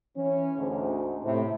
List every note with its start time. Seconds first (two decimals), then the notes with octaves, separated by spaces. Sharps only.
0.16 E3 C#4
0.57 D2 G#2
1.23 A2 C3